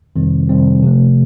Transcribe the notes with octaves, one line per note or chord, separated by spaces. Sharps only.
F2 C3 D#3 G3 C4
F2 C3 D#3 G3 C4
C3 F3 A3